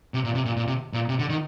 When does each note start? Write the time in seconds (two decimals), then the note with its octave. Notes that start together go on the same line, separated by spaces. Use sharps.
0.14 C3
0.24 A#2
0.35 C3
0.45 A#2
0.56 A#2
0.67 C3
0.93 A#2
1.09 C3
1.19 D3
1.30 D#3